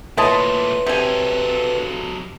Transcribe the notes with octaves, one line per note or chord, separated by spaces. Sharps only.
A#2 A3 E4 B4 C#5 D#5 A5 C6
C3 F#3 A4 G#5